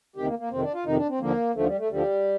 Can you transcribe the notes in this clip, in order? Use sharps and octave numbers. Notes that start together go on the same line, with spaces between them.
D2 C3 D#3 G4
A#3
A#3
F2 C3 D#3 C4
D4
F4
F2 C3 D#3 D#4
D4
C4
D#2 D3 F3 A#3
D#2 D3 F3 A3
G3
A3
D2 D3 F3 G3